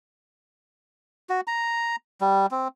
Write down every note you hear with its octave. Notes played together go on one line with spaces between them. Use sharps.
F#4
A#5
G3
C4